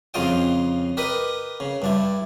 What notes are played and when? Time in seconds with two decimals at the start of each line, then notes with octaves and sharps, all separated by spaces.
0.14 F2 C#3 F4 D#5 G5
0.97 G4 A#4 B4 D#5 B5
1.60 C#3
1.82 G2 D4 E4